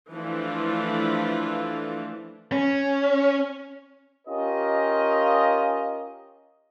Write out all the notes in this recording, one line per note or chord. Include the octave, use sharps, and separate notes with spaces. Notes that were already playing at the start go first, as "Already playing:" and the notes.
E3 F3 A3 D4 F4
C#4
C#4 F4 G4 A#4 D#5